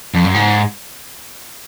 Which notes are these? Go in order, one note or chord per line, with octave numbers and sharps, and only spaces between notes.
F2
F#2
G#2